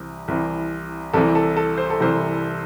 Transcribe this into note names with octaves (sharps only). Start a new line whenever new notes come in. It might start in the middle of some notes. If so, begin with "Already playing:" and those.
Already playing: C2 C3 E3
C2 C3 E3
C2 C3 E3 A4
A4
A4
C5
A4
C2 C3 E3 C5